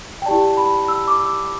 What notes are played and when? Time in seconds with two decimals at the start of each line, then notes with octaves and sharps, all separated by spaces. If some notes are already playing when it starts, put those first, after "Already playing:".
0.22 G5
0.26 E4 G4 D5 A5
0.57 B5
0.88 E6
1.08 D6
1.19 E6